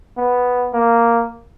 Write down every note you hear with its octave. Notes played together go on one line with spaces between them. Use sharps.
B3
A#3